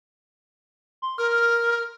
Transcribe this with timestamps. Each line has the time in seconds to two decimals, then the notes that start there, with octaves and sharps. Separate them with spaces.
1.02 C6
1.18 A#4 F6